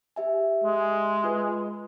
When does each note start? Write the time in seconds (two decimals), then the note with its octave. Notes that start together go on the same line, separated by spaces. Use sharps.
0.16 G4 E5 G#5
0.64 G#3
1.24 F4 B4